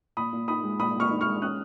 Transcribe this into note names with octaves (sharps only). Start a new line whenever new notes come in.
A#2 B5 D#6
A#2
D#4 B5 D#6
G#3
A#2 B5 D#6
A#2 C#6 F6
D#4
C#6 F6
G#3
C#4 D#6 F#6